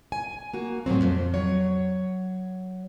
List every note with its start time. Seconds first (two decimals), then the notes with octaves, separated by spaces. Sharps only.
0.12 G#5
0.53 A#3 F#4
0.86 A2 F3 F#3 C4
1.01 F2
1.34 F#3 C#5